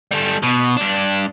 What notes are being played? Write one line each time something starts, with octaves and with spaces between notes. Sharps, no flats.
G3 A4
B2
G2 D4